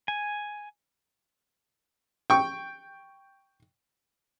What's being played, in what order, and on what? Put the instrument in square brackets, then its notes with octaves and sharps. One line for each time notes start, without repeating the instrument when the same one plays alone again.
[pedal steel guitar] G#5
[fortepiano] G5 C#6